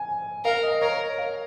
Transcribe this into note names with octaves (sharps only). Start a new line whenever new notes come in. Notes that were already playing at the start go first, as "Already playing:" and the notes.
Already playing: G#5
A#4 F5
D#5
A#4 C#5
F5